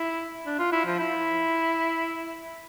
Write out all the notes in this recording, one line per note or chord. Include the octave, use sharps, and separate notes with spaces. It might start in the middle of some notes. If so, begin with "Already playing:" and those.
Already playing: E4
D4
F4
E4
F3
E4